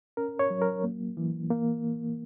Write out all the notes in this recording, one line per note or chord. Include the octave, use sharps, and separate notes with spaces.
C#4 A#4
C#5
F#3
A#4
A#3
E3
A#3